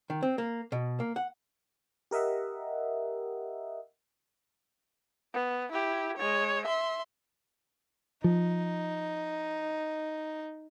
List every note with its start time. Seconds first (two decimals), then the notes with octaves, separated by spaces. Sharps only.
0.10 D#3
0.23 C4
0.38 A#3
0.72 B2
1.00 A#3
1.16 F#5
2.11 G4 A#4 D#5 E5 F#5
5.34 B3
5.72 E4 G4
6.17 G#3 C#5
6.66 E5 C6
8.24 F3 D#4